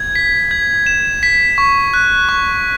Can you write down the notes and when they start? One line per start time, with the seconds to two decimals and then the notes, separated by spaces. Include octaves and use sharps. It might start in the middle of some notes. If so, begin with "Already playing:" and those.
Already playing: G#6
0.15 B6
0.51 G#6
0.86 E7
1.23 B6
1.58 C#6
1.94 F#6
2.29 C#6